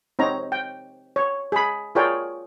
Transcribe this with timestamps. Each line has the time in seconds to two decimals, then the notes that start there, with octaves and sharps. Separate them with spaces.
0.19 C4 D#4 C#5 A#5
0.52 G5
1.16 C#5
1.52 G#4 B5
1.95 F4 G#4 A#4 C#5 D5 G5